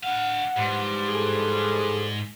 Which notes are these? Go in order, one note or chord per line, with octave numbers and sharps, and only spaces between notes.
D4 F5 F#5
G#2 E3 F3 G3
G#4 A4